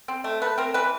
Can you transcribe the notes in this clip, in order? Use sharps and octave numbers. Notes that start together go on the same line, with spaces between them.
C4
A3
A3 B4
C4 A#4
E3 B4